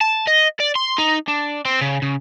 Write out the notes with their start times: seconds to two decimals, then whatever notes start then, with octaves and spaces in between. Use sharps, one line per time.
0.01 A5
0.27 D#5
0.60 D5
0.75 C6
0.98 D#4
1.28 D4
1.65 C4
1.81 C#3
2.02 C#3